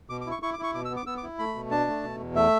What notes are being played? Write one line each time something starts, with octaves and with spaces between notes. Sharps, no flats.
B2 D6
D6
E4
C#6
E4 C#6
D6
E4 C#6
B2 D6
E6
B3
D6
B3 E6
D6
E4
A3 B5
B2
D4 A5
A3
B2
E2
A3 E5